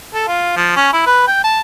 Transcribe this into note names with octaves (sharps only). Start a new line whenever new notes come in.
A4
F4
F3
C#4
E4
B4
G5
A5